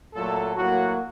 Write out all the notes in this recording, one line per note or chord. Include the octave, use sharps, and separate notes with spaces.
A#2 F#3 A3 A4
A2 F#3 A#3 F#4